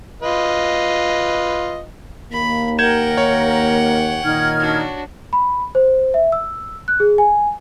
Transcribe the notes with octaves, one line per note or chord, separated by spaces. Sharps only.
F4 B4 D#5
D#2 A#3 B5
A#4 F#5 G5 G6 G#6 E7
C#5
A#2 D#3 D#4 F6 G#6
D4 F#4
B5
C5
E5
E6
F#6
G#4
G#5